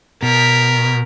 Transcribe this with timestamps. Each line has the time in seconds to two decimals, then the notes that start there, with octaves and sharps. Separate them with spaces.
0.23 B2 A#4 B6